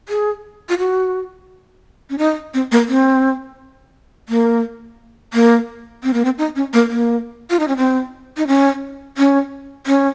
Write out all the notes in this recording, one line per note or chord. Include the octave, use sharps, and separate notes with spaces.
G#4
F4
F#4
C#4
D#4
C4
A#3
C4
A#3
A#3
C4
A#3
C4
D#4
C#4
A#3
A#3
F4
D#4
C#4
C4
D#4
C#4
C#4
C#4